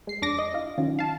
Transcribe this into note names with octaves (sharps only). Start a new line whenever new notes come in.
G#3 C7
F2 D4 D6 A#6
D#5
E4 F4
D#3 F#3 C#4 F4
F5 A5